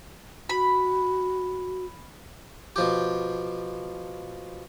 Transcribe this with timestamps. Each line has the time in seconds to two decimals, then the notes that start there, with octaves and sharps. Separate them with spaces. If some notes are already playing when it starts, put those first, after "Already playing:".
0.49 F#4 B5
2.76 B2 F3 G4